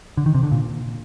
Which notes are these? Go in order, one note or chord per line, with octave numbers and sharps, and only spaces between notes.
D3
D#3
C3
D3
A#2